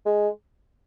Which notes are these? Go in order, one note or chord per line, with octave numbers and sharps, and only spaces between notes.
G#3